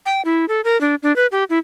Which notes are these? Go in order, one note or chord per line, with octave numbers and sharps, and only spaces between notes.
G5
E4
A4
A#4
D4
D4
B4
G4
E4